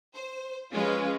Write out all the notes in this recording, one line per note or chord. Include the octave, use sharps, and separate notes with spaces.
C5
F3 G#3 C#4 F4 B4